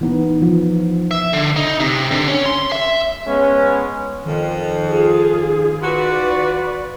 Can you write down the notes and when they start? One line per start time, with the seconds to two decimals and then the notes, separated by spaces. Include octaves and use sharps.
0.01 E3 B3 D#4
0.42 F3
1.11 E5
1.33 D3
1.56 D#4
1.80 C3
2.11 D3
2.28 C#4
2.46 C6
2.72 E5
3.27 G#3 B3 C#4
4.25 F2 D#3
4.86 F4 G#4
5.81 F4 F#4 B4 D5